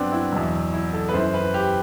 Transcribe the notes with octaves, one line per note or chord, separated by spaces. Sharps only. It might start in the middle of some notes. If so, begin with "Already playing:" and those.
Already playing: G2 F#3 B3 C4 D4
E4
E2 B2 F#3
E4
A4
B4
F#2 E3 C5
B4
G4